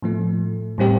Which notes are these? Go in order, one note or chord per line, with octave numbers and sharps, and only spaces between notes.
A2 F3 A3
A2 G3 C4 G4